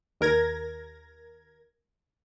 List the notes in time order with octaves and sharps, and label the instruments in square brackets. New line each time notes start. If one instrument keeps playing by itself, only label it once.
[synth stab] D#2 A#4 G#6 A#6